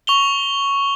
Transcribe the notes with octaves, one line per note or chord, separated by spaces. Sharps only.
C#6 F7 G7